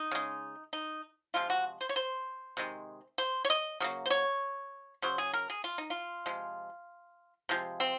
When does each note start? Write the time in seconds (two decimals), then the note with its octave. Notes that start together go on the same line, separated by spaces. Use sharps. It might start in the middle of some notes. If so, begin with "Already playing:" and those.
Already playing: D#4
0.11 C#3 G#3
0.73 D#4
1.34 C3 F3 G#3 F4
1.50 F#4
1.81 C5
1.89 C#5
1.96 C5
2.57 C3 D#3 G#3
3.18 C5
3.45 C#5
3.50 D#5
3.80 C#3 F#3 A#3
4.06 C5
4.10 C#5
5.02 C#3 F#3 C5
5.18 G#4
5.34 A#4
5.50 G#4
5.64 F4
5.78 D#4
5.90 F4
6.26 C3 F3 G#3
7.49 C3 F3 G#3
7.80 C4